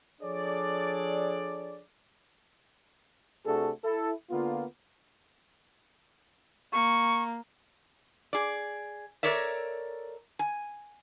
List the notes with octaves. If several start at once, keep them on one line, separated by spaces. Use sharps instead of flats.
F3 D4 G#4 A4 C#5 D5
C3 A3 D4 F#4 G#4 A4
E4 A4
D3 A#3 B3 F4
A#3 C#6
G#4 D5
A4 A#4 C#5 D5 E5
G#5